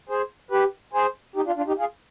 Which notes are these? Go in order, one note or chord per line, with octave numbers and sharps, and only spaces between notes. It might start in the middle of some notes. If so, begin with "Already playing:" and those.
G#4 C5
G4 B4
G#4 C5
D#4 G4
D4 F4
D4 F4
D#4 G4
F4 G#4